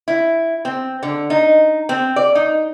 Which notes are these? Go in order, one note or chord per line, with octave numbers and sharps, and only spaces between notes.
E4
C4
D3
D#4
C4
D5
D#4